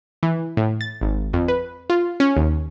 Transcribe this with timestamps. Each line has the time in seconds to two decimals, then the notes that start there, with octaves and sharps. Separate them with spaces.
0.23 E3
0.57 A2
0.81 A6
1.01 G#1
1.33 F2
1.48 B4
1.90 F4
2.20 C#4
2.37 D#2